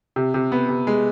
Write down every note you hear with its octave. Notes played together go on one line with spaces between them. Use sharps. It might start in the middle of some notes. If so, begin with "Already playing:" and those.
C3
C3
B3
C3
G#3